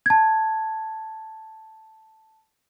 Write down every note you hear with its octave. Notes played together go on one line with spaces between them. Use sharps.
A5 G#6